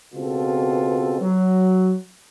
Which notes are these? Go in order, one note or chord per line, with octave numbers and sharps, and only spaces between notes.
C#2 B2 C4 F4 A4
F#3